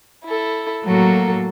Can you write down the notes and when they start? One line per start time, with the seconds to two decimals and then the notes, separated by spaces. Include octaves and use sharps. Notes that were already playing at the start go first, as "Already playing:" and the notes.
0.25 E4 A4
0.83 A2 F#3 A#3 F#4 A4